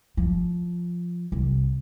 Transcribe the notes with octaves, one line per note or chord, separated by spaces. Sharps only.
F3
C2